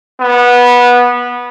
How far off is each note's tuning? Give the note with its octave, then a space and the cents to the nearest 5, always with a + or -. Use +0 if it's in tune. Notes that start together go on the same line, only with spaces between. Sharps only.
B3 -20